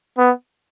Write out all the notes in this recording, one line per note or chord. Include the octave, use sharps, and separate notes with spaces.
B3